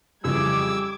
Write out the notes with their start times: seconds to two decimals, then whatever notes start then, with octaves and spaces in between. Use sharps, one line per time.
0.24 F2 C#3 E3 G3 D6 E6 G#6